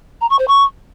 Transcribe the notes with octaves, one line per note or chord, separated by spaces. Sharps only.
A#5
C#6
C5
C#6